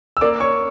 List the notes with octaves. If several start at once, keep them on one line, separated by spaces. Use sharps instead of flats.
E6
A#3 D5 D6
C#5 C#6